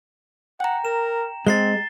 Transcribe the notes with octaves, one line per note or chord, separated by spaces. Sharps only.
F#5 G5 A#5
A#4 E7
G#3 C4 A6 C7 G7